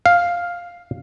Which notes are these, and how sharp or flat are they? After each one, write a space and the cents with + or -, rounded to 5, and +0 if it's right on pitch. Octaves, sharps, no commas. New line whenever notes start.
F5 +5